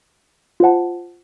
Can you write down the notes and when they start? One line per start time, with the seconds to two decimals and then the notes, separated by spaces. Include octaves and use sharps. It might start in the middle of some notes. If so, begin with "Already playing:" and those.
0.60 F4 C5 F#5 A5